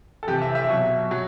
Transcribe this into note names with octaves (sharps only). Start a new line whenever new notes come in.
A4
C3 E3 G4
E5
E5
B2 F#3
F#3